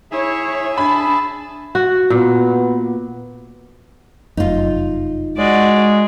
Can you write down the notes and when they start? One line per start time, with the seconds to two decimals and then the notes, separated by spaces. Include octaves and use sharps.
0.11 E4 G#4 C#5 E5
0.78 D4 A5 B5
1.75 F#4
2.10 A#2 B3
4.37 F1 F#2 D#4 F4
5.38 G#3 F#4 D5